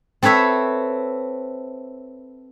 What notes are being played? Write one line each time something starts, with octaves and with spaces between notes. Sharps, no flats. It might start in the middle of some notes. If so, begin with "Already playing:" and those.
C4 A4 B4 C#5 E5